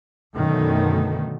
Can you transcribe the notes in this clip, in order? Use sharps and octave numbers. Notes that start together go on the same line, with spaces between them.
F#2 B2 D3 D#3 A3